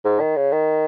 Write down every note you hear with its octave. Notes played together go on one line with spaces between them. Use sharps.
G#2
D#3
C#3
D#3